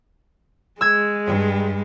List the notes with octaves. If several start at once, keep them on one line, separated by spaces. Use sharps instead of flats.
G#3 E6 G#6
G2 G3